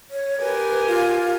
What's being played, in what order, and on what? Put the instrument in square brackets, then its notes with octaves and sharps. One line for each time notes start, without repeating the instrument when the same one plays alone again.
[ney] C#5
[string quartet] G4 A#4 G#5 [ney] B4
[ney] F4